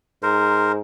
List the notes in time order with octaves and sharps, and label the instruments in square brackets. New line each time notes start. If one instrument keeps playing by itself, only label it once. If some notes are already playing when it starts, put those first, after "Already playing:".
[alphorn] G#2 [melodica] A#4 C5